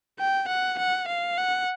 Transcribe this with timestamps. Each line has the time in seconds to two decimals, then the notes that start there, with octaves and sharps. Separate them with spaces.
0.20 G5
0.48 F#5
0.79 F#5
1.08 F5
1.38 F#5